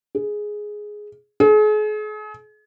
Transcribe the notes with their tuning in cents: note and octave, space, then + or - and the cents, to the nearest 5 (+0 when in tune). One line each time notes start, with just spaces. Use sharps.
G#4 +5
G#4 +40